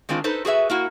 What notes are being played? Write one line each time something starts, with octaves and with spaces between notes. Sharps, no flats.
D#3 G#3 C4 D4 F4
D#4 A4 B4 C5
F#4 G#4 B4 E5
A#3 E4 F#4